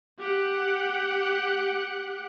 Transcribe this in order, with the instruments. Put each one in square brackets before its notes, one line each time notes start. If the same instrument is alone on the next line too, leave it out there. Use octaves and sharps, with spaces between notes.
[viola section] G4 F#5